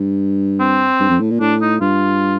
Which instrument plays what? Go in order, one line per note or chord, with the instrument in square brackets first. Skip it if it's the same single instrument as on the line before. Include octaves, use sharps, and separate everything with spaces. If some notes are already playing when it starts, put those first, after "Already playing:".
Already playing: [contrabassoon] G2
[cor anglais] C4
[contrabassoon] G2
F2
A2
A#2
[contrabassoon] A2 [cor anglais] D4
[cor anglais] D#4
[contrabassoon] G2 [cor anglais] F4